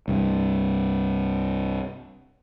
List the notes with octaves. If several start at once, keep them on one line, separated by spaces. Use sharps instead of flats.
C2 G2 C3